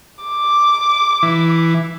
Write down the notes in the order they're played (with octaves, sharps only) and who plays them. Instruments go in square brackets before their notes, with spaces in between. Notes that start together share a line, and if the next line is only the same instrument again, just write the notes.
[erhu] D6
[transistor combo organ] E3